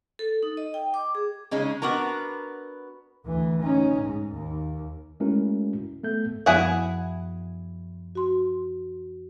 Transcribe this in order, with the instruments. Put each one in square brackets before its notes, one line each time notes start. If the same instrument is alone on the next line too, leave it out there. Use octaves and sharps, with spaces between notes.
[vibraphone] A4
D#4
D#5
G5
D6
G#4
[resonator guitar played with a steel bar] C#3 G#3 C#4 D#4
B3 D4 F#4 A#4 A#5
[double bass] D2 E3
C#4 D#4
G#2
D#2
[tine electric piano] G#3 A3 C#4 E4 F#4 A#4
A3 B3 A4 G6
[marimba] F#2 F3 B3 [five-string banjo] E4 G#4 F#5
[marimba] F#4 C6